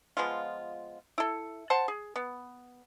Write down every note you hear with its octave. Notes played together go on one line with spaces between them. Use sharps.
F3 G#3 B3 F4
E4 A4
C5 F#5 A5
G#4
B3